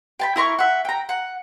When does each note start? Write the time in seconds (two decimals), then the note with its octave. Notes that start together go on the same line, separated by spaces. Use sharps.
0.19 G5 A5 B5
0.36 E4 A#4 B5 C#6
0.59 E5 F#5
0.85 G5 A#5
1.09 F#5